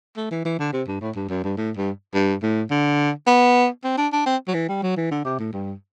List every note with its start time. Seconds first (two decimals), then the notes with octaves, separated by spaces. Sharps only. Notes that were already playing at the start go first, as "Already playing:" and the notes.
0.17 A3
0.31 E3
0.45 E3
0.59 D3
0.73 C3
0.88 G2
1.01 A2
1.16 G2
1.30 F#2
1.44 G2
1.58 A2
1.77 G2
2.15 G2
2.43 A2
2.71 D3
3.27 B3
3.84 C4
3.98 D4
4.12 D4
4.26 C4
4.48 F#3
4.54 E3
4.69 G3
4.83 F#3
4.97 E3
5.11 D3
5.25 C3
5.39 A2
5.53 G2